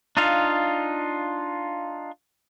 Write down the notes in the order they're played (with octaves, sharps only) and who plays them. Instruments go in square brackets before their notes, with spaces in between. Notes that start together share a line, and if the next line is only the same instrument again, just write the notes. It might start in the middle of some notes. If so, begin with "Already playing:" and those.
[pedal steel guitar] D4 D#4 F4 F5